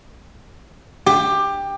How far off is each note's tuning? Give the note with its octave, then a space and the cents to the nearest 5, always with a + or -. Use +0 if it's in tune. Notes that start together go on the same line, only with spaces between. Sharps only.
G4 +15